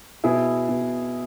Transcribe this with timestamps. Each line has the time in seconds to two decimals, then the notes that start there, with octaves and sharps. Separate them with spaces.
0.24 B2 E4 G#4
0.69 B2